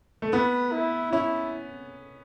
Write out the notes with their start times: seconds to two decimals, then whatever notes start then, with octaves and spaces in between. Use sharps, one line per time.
0.22 A3
0.33 B3 B4
0.72 E4
1.13 C#4 E4